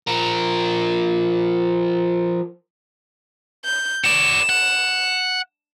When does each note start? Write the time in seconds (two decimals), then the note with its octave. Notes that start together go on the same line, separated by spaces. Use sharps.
0.07 F3 A#4
3.65 G6
4.04 F#4 D5 E7
4.49 F#5